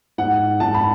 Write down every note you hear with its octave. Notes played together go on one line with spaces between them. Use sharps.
G#2 F#5
G#2 A5
B5